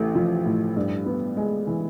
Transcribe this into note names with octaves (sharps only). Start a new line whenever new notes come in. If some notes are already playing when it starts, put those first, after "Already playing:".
Already playing: A1 A3
F3
A2
G2
B3
G#3
E3